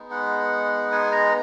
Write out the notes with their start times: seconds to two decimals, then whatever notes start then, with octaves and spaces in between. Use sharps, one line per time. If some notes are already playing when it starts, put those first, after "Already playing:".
Already playing: G#3 B3 D#4
0.11 F#5
0.92 G#5
1.12 A#5